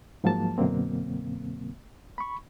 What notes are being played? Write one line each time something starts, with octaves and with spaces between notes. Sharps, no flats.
G#2 F3 F#3 A#3 A5
F#2 B2 D3 F#3 A#3 C4
B5 C#6